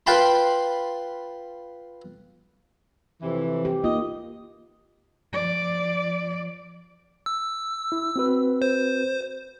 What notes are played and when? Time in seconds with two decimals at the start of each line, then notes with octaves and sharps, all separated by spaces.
0.07 F4 B4 G5 A5 B5 C6
3.22 F2 C3 E3
3.65 G4
3.84 A#3 D#4 F4 D#5
5.33 F3 D5
7.26 E6
7.92 E4
8.16 C4 F#4 B4
8.62 C5